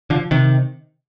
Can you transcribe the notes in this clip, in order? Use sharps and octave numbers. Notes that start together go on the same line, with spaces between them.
D3 F3
C3 D#3